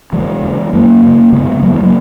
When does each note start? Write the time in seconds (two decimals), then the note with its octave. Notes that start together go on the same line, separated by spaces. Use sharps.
0.13 E2 C#3 E3 G#3
0.43 E2 C#3
0.73 F#2 C#3 F#3 A#3
1.03 F#2 C#3
1.33 F#2 C#3 G#3 B3
1.63 F#2 C#3 F#3 A#3
1.73 E3 G#3
1.83 F#3 A#3